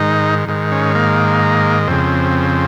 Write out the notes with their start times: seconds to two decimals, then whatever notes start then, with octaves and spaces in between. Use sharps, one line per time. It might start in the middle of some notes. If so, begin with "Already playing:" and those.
Already playing: G#2 D#3 D#4
0.48 G#2 D#3
0.72 C#4
0.95 A#3
1.88 F2 C#3 C4